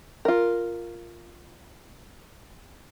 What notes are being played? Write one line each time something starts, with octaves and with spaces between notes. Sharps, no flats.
F4 A#4